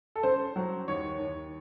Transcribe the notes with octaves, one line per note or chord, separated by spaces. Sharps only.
A4
C#3 C5
F#3
D#2 C#5
D#2